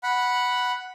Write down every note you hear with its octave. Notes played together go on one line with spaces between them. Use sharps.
F#5 B5